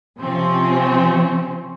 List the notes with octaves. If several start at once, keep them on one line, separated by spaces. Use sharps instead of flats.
C3 F3 C4 C#4